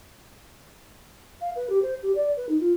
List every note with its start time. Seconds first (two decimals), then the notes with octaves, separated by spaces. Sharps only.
1.41 F5
1.56 B4
1.70 G4
1.82 C5
2.03 G4
2.15 D5
2.37 B4
2.49 D#4
2.60 F4